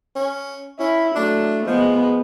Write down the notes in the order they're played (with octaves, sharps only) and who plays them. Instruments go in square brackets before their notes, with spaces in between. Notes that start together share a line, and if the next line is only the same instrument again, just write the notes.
[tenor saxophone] C#4
[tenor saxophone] C#4 [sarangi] E4
[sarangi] F#3 [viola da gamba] A3 [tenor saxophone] D4
[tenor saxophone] F3 [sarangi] G#3 [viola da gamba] B3